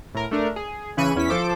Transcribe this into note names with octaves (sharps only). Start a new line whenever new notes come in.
A2 A#4
A3 D4 A#4
G#4
C#3 E3 B5 C#6 D#7
E2 C#4 E4 B6
F3 A4 C5 D6